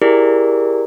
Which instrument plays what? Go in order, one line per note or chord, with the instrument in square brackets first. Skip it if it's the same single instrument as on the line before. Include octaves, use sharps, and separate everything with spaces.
[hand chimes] E4 G4 G#4 A#4 D5